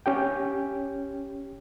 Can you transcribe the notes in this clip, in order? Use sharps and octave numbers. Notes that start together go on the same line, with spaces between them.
C#4 G4 G5